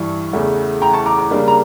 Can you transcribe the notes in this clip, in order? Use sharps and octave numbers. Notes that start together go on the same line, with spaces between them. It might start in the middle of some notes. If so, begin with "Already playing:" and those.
Already playing: G2 E3 G3 C#6
E2 C#3 E3 A3
G5 A#5
A5 C#6
A#5 D6
A#5 D6
C#3 G3 A#3 D4
A#5